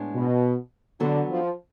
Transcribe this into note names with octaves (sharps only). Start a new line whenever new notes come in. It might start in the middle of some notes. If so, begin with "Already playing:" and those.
Already playing: A2 G#3 B3 D4
B2
D3 F#3 B3 D4 F#4 A4
F3